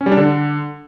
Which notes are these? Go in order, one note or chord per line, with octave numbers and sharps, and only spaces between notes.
C#4
G3
D4
D3